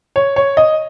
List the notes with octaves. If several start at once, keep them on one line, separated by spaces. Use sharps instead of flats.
C#5
C#5
D#5